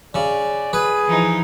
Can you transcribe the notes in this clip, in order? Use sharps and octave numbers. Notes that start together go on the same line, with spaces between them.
C#3 D5
G#4 B4
E3 F3 D#4